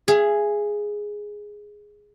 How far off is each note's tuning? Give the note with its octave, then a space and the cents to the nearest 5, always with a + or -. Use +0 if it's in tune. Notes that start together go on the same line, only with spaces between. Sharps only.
G#4 +0 E5 +35